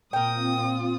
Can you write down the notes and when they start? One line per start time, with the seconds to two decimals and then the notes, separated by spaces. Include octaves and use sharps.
0.13 A#2 C4 F4 A#4 G5 D#6